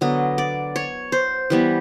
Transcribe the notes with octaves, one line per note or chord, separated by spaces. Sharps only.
D3 F#3 B3 D#5
D5
C#5
C5
E3 G3 B3